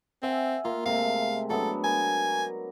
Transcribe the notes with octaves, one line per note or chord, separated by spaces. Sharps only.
C4 E5 F#5 G#5
A#3 F4
C3 G#3 A3 F5
F#3 B3 D4 A4
A#4 G#5